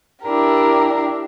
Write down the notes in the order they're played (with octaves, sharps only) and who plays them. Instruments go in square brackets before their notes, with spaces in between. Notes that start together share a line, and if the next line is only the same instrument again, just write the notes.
[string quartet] D4 E4 G4 A#4